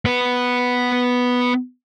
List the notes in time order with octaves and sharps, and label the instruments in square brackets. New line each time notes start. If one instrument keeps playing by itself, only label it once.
[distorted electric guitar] B3 B4